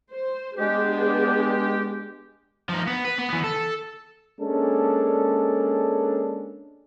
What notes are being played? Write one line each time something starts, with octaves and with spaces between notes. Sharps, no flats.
C5
G#3 B3 D4 G4 G#4
F3 D#4
B3
B4
B3
E3 B3
A4
G#3 A#3 C#4 D4 A4